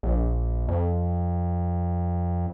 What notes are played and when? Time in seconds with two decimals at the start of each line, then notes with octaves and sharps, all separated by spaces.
0.03 A#1
0.68 F2